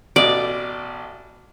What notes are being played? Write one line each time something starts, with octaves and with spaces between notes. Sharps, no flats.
A1 B2 D5 D#5